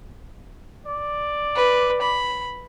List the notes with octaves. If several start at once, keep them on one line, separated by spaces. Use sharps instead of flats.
D5
B4
B5